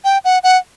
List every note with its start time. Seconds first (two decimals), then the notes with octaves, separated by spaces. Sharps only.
0.04 G5
0.25 F#5
0.43 F#5